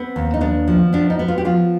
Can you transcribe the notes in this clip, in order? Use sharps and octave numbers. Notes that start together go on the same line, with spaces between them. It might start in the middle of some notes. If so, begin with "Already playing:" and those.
Already playing: B3 C4
D#2
D#4
B3 D4
F3
B3 D4
D#4
B3
F4
G4
F3 F4